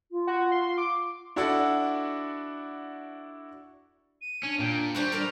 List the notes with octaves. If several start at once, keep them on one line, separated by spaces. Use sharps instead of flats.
F4
F#4
C6
D6
D4 E4 F#4 A4 D5 F#5
D#7
C#4 D4
A#2 G5
G3 F#4 C5 D5 F7
A#4 C5